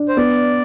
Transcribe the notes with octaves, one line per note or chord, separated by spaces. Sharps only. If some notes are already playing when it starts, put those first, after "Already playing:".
Already playing: D4
C5
B3 D5